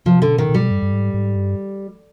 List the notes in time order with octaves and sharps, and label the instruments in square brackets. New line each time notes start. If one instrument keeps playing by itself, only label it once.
[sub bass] C3 [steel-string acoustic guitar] F3
[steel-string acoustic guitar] D3
[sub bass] B2
[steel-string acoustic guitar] D#3
[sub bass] B2
[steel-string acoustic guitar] G3
[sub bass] G2
G2
G#2
G#2
G2